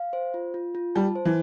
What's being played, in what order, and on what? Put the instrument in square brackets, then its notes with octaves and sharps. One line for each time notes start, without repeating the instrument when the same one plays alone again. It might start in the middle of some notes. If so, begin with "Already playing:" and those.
Already playing: [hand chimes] F5
C5
F4
F4
F4
[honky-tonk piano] G3 [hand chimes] A5
[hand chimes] C5
[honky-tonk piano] E3